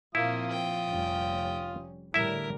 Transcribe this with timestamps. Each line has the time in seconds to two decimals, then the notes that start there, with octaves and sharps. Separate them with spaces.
0.15 A#2 F3 A#3 C4 E4 F4 D#6
0.50 G5
0.90 F1 G3 C#4
2.14 A2 D3 G3 E4 A#4 E5